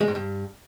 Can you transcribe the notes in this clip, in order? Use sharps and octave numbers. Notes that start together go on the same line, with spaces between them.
G#3
G#2
G2